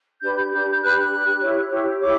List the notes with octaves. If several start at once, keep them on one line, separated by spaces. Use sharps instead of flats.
D4 G4 B4 G6
G6
D4 G4 B4 G6
G6
D4 G4 B4 F#6
D4 G4 B4
E4 G4 C#5
E4 G4 C#5
E4 G4 C#5 D6